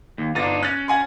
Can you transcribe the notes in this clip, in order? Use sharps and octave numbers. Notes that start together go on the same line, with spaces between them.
D#2
G1 D4 D#4 A6
C#4 F#6 A6
F#5 G#5 C6